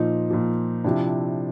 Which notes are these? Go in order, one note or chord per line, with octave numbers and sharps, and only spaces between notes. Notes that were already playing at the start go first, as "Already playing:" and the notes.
Already playing: A#2 F3 D#4
A#2 F3
C3 F3 D4 E4